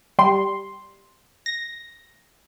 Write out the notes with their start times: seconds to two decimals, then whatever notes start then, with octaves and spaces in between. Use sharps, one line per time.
0.19 G3 C6
1.46 A#6